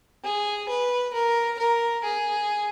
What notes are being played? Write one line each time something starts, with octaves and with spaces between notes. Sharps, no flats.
G#4
B4
A#4
A#4
G#4